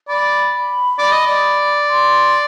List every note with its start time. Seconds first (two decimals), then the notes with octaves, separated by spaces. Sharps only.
0.08 D5 B5
0.99 D5
1.12 D#5
1.26 D5
1.89 C6